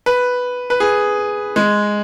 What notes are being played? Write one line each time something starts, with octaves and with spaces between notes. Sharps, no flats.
B4
B4
G#4
G#3